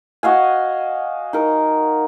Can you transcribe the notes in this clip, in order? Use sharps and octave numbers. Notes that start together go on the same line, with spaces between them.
F#4 D#5 F5 G#5
D#4 A#4